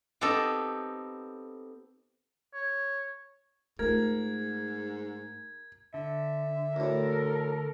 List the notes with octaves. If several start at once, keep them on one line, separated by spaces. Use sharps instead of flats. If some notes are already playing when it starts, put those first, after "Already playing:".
B3 C4 D#4 G4 A4
C#5
G#2 A3 F4 A#4 G#6
D3 E5
D2 A2 A4 A#4